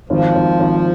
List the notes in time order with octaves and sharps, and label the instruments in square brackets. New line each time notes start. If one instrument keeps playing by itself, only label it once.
[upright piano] G#1 [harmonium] F3
[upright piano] G#1
G#1